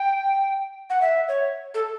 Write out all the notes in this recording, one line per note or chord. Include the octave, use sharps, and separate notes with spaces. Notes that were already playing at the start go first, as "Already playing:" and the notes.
Already playing: G5
F#5
E5
C#5
A4